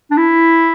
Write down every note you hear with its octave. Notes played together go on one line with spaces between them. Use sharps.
D4
E4